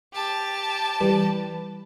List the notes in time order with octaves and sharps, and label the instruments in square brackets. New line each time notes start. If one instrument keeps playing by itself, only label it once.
[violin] G4 A5
[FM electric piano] E3 G3 B4